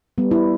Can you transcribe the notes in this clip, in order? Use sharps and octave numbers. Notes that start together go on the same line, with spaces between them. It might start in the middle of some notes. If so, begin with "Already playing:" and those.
G3 B3
E4